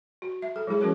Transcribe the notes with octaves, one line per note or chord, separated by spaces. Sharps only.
F#4
E5
A4
F#3 G#3 E4 G#4 C#5
F3 C#4 F#4 A#4 C#5